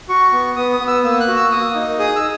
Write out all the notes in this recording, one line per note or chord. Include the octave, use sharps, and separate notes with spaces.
F#4 C#6
B3
B3 D#6
D#6
B3
E6
A#3 E6
F#6
F#4
E6
A#3 D#6
D#4
G#4 D#6
E6